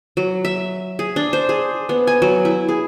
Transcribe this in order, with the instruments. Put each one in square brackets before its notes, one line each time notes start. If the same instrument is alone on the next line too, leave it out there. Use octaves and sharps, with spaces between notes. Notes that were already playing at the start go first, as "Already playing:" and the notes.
[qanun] F#3
E5
G#4
D4
C5
G#4
B3
G#5
F#3
E4
G#4